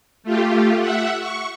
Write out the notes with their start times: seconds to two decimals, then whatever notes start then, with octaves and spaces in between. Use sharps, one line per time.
0.23 A3 F4 G4
0.80 E5 F#5
1.20 C#6